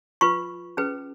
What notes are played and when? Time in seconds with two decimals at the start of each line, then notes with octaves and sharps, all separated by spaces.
0.21 F4 B4 C#6
0.77 C#4 G#4 B4